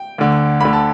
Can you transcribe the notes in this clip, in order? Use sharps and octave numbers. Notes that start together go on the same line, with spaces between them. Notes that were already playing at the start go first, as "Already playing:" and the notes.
Already playing: G5
D2 D3
D2 D3 B5
A5